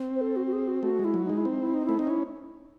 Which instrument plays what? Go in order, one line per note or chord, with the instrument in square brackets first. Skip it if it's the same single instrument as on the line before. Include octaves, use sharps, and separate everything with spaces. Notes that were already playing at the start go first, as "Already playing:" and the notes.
Already playing: [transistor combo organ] C4
[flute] C5
A4
F#4
F#4
G#4
F#4
[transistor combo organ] A3 [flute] F#4
[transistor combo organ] G#3
[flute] E4
[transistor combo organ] F#3
[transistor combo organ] G#3 [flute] D#4
[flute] E4
[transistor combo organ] C4 [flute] D#4
[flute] E4
D#4
[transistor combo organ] A3 [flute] E4
[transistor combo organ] C4 [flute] D#4
[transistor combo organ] C#4 [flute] E4